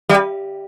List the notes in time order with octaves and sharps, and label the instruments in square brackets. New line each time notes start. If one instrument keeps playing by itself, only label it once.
[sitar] G3